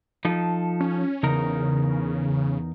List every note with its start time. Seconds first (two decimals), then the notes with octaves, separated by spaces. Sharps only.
0.25 F3 D#4 A4
0.80 C#4
1.23 E2 C#3 D#4 A#4